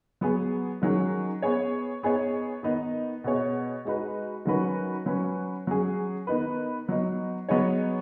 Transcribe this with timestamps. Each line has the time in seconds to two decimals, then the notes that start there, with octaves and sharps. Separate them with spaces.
0.21 F#3 B3 G#4
0.82 D#3 F#3 C#4 G#4
1.42 B3 G#4 C#5
2.03 B3 D#4 G#4 C#5
2.63 D#3 B3 D#4
3.24 B2 B3 G#4 C#5
3.85 G#3 D#4 F#4 B4
4.45 D#3 F#3 C#4 F#4 B4
5.06 F#3 C#4 B4
5.67 F#3 C#4 G#4
6.27 D#3 B3 D#4 B4
6.89 F#3 B3 D#4
7.49 F#3 B3 D#4 G#4 C#5